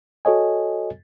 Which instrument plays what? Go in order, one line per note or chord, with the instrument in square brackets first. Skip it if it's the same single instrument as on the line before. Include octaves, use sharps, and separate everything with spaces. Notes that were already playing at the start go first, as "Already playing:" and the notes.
[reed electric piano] F#4 A4 C#5 D#5 G#5